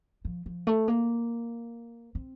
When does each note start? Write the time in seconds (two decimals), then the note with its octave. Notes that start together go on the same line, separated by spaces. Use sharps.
0.25 F3
0.46 F3
0.67 A3
0.88 A#3
2.15 C4